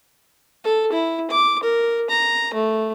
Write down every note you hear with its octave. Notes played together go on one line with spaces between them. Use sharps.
A4
E4
D6
A#4
A#5
A3